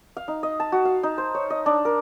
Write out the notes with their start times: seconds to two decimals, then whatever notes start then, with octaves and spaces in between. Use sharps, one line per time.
0.17 F5
0.28 D#4
0.43 D#5
0.60 A5
0.72 F#4
0.85 F5
1.03 D#4
1.18 C5
1.35 C#5
1.50 D#5
1.66 D4
1.85 A#4